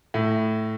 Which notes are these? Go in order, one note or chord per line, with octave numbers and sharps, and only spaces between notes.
A2